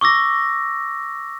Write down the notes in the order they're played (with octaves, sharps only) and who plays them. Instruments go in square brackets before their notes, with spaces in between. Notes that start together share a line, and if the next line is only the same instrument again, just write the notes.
[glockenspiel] C#6 D6 E6 A#6